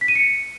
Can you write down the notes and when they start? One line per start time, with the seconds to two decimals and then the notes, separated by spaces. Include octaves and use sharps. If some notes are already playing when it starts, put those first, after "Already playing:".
0.01 B6
0.08 D#7
0.15 C#7